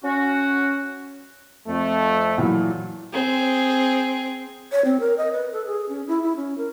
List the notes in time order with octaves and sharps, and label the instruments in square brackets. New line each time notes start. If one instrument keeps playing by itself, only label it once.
[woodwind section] C#4 F#4
[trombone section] F2 A3
[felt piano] A#2 E3 F#3
[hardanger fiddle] C4 G#4
[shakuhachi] C#5
C4
A#4
D#5
B4
A4
G#4
C#4
E4
E4
C#4
A#4